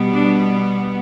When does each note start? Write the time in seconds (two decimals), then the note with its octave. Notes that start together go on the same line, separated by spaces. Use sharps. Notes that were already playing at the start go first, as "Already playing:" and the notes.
Already playing: B2 G3 B3
0.14 D4